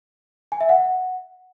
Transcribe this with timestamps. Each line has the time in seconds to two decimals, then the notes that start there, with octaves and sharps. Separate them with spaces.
0.52 G#5
0.61 E5
0.69 F#5